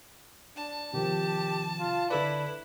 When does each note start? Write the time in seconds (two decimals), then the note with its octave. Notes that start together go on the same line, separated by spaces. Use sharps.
0.56 D4 A5
0.93 C3 D#3 F3 G4
1.79 F4
2.10 D3 E4 A4 B4 D5